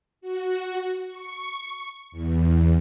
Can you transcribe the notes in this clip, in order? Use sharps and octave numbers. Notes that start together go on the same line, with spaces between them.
F#4
C#6
E2